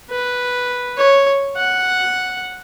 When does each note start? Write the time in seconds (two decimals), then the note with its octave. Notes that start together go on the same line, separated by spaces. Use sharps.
0.11 B4
0.98 C#5
1.57 F#5